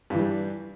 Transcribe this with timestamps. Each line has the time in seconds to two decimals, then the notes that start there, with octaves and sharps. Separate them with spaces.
0.10 G2
0.15 E3
0.19 G3